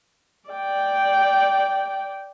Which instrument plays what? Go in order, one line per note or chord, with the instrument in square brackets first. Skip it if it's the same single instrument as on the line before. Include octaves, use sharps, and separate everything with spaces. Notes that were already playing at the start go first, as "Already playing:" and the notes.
[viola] D5 G5